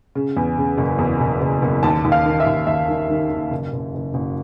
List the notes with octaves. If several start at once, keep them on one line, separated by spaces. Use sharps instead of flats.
C#3
E2
C#3
F#1
E2
F#1
F#1
F#1
D#2 A5
D#2
F5
D#3
E5
D#2
D#2 E5
D#3
D#3
D#3
F#1
F#1
F#1
F#1